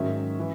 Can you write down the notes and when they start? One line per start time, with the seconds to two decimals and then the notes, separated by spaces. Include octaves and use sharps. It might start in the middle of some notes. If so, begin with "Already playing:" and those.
Already playing: G#2 D#3 F#3 C#4 E5
0.39 E3